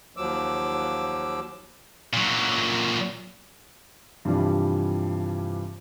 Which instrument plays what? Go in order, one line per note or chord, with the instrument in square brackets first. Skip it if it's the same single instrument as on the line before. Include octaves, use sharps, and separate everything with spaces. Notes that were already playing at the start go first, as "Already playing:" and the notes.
[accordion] D#2 F3 F#3 D6 E6
[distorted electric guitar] A#2 F#3
[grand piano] G2 C3 E3 F3 G3